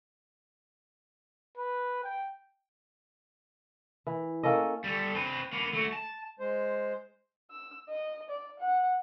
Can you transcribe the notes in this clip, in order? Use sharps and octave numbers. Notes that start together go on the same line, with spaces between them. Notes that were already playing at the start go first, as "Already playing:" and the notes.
B4
G5
E3
A#3 C#4 A4 D#5
G3 A4
C4 B4
A#3 B3
A3 F#4
A5
G#3 C5
E6
D#5
D5
F#5